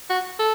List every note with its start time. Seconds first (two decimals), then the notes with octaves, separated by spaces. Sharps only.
0.09 F#4
0.39 A4